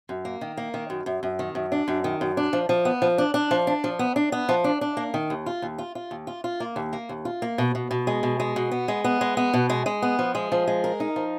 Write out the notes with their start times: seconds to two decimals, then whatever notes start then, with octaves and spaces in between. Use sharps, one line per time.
0.09 F#2
0.25 A#3
0.41 D#3
0.57 A#3
0.74 D#3
0.90 F#2
1.06 F#2
1.23 F#2
1.39 D#3
1.55 F#2
1.72 D4
1.88 F#2
2.04 D#3
2.21 F#2
2.37 D4
2.53 F3
2.69 F3
2.85 B3
3.02 F3
3.18 D4
3.34 D4
3.51 F3
3.67 D4
3.84 F3
3.99 B3
4.16 D4
4.32 B3
4.49 F3
4.64 D4
4.81 D4
4.97 A#3
5.14 D#3
5.30 D#2
5.46 F4
5.62 D#2
5.78 F4
5.95 F4
6.11 D#2
6.27 F4
6.44 F4
6.60 A#3
6.76 D#2
6.93 A#3
7.09 D#2
7.25 F4
7.42 A#3
7.58 B2
7.75 B2
7.91 B2
8.07 G#3
8.23 B2
8.40 G#3
8.56 B2
8.71 B3
8.88 G#3
9.04 B3
9.21 G#3
9.37 B3
9.54 B2
9.70 G#3
9.86 G#3
10.02 B3
10.19 F3
10.35 G#3
10.52 F3
10.67 G#3
10.84 A#4
11.00 D#4
11.16 F3